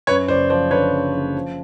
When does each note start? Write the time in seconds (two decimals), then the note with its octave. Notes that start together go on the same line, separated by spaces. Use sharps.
0.07 F#2 B4 C#5
0.28 F#1 C5 D5
0.50 F3 C5 D5
0.71 D3 B4 C#5
0.92 F#1
1.14 F#1
1.35 F3